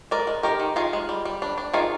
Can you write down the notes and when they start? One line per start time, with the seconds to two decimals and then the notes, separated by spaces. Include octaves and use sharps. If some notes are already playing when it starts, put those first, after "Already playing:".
0.11 G#3 A#4 D5
0.27 G#3
0.43 D#3 G4 A#4
0.60 D#3
0.76 D#3 F4 G#4
0.93 G#3
1.09 G3
1.25 G3
1.42 D4
1.58 D4
1.74 D#3 F4 G#4